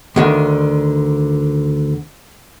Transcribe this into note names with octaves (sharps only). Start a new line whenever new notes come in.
D2 D3 D#3